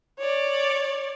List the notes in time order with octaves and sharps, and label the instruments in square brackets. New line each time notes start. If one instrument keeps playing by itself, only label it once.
[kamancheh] C#5 D5